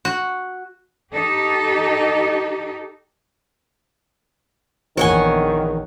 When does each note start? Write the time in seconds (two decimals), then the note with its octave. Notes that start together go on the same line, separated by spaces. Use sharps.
0.05 F#4
1.13 D#4 G4 A4
4.97 A#1 E2 D#3 C#5 F#5 G#5